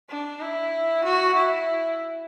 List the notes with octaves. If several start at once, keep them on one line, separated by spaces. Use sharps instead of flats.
D4
E4
F#4
E4